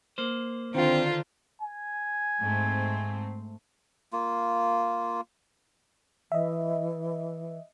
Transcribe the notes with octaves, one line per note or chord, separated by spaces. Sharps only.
A#3 C5
D3 D#3 C4 D4 F4 C5
G#5
G#2 A3 C4
A#3 F4
E3 D#5 E5